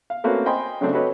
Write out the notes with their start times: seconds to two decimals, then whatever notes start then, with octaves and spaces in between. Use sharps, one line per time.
0.10 F5
0.24 A3 A#3 C4 C#4 F#4 B4
0.46 C5 D#5 G5 G#5 B5 C6
0.81 C#3 F#3 A3 C4 D4
0.92 F#4 G4 A4 B4 C#5 D#5